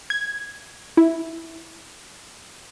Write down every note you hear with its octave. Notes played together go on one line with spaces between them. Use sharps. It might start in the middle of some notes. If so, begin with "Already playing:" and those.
G#6
E4